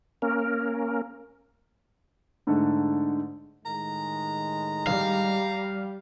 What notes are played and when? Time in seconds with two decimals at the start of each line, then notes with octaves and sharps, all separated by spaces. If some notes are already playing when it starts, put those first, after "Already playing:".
0.22 A#3 C#4 A#4
2.47 G#2 D3 A3
3.66 A2 D#3 G#3 A#5
4.87 G3 F5